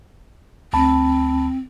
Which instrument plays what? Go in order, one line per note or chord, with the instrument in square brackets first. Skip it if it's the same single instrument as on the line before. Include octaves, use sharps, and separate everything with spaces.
[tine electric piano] D2 A5 B5 [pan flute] C4